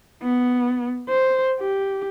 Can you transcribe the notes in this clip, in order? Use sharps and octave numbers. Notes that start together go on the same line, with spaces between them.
B3
C5
G4